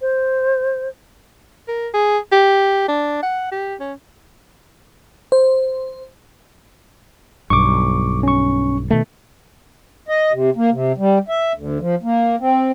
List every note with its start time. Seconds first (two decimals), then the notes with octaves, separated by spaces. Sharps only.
0.01 C5
1.68 A#4
1.94 G#4
2.32 G4
2.88 D4
3.22 F#5
3.52 G4
3.80 C#4
5.32 C5
7.50 B1 G2 C#6 D6
8.23 C#4 C#6
8.90 B2 D#3 A3
10.08 D#5
10.32 C3
10.56 A#3
10.71 C3
10.98 G3
11.28 E5
11.55 D2
11.80 F3
12.03 A#3
12.40 C4